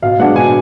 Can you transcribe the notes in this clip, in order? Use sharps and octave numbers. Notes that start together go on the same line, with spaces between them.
B2 F5
G#3 B3 D4 F#5
B2 G#5